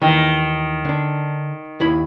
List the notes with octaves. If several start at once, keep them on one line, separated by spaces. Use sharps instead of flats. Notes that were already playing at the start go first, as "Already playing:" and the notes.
D#2 D#3 E3
D3 D4
D#2 E4 B5